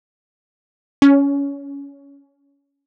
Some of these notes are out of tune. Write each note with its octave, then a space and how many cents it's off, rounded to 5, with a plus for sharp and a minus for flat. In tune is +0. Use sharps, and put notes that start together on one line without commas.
C#4 +20